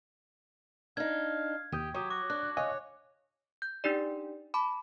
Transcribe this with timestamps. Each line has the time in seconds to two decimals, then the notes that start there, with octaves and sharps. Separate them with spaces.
0.97 D4 D#4 F5 G#6
1.72 D#2 G4 D#6 G6
1.94 F#3 G4 C#5 D#6
2.10 F#4 D6
2.30 D4 F#6
2.57 C#5 D#5 F5 G#5
3.62 G6
3.84 D4 D#4 G4 D5
4.54 A5 B5 D6